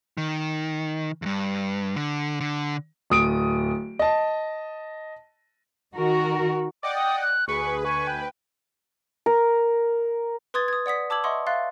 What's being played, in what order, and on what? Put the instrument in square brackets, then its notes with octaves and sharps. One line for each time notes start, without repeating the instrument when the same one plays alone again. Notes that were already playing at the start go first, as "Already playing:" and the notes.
[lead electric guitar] D#3
E2 G2
D3
D3
[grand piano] D1 D#6 D7
D#5 A5
[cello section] D#3 F#4 A#4
[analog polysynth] D5 D#5 F#5 [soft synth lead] G5 [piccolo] D6
[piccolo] D#6
F#6
[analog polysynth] D2 B4 [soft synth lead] G#4 [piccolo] C#6
[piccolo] G#5 [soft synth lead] C#6
[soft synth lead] G5
[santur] A#4
[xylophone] B4 C6 D#6 G#6 A6
D#6 G#6
D5 F#5 D#6 B6
A5 D6 E6 G#6 F#7
D#5 E5 F#5 C6 C#6 D#6
E5 F5 C6 F#6 A6